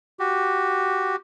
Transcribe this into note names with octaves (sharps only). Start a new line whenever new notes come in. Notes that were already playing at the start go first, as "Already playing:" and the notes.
F#4 G4